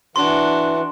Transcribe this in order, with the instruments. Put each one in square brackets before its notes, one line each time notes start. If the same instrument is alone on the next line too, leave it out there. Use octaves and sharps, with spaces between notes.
[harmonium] E3 [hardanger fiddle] D4 F#4 [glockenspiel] C6